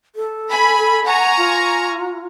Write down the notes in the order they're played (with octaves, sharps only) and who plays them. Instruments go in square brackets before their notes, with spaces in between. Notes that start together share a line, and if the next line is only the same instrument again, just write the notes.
[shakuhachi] A4
[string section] G#5 B5
[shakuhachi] F#5 [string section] G#5 A#5 C#6
[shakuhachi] F4